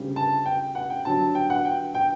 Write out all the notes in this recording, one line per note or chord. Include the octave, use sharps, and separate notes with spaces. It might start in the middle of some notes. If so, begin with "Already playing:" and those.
Already playing: D2 C#3 G3
A5
G5
F#5
G5
G2 D3 F#3 A5
G5
F#5
G5
G5